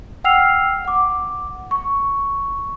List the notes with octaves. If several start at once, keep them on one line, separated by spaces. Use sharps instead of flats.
F#5 G5 E6 F6 C7 F7
F#5 D6
C#6